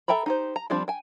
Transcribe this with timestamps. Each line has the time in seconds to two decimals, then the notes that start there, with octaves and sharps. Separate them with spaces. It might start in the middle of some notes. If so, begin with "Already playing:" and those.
0.08 A4 E5 G5 A#5 B5
0.26 D#4 G4 C5
0.56 A#5
0.70 F3 G3 C4 D4 F4
0.88 G5 G#5